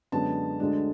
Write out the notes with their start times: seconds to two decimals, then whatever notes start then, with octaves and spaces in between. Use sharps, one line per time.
0.12 F#2 D3 G#3 B3 D4 A5
0.60 D2 D3 G#3 D4